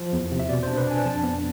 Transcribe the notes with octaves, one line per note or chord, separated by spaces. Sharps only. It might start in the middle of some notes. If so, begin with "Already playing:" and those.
Already playing: F3
E2
C3
E5
B2 D5
C5
D4
B4
D4 G#5
F2 A5
B3